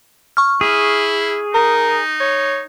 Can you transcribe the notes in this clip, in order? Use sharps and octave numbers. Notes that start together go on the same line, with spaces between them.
C#6 F6
E4 G#4
D#4 A#4
C#5